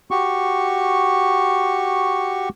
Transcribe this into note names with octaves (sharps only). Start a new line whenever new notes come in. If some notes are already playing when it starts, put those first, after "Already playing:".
F#4 G4 C#6